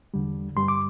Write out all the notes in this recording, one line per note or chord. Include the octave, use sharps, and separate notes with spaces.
E2 D3 G3
G2 D3 G3 C6
D6